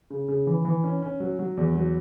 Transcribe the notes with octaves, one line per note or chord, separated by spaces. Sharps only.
C#3
C#3
E3
E3
C#4
C#4
F#3
F#3
E2
F#3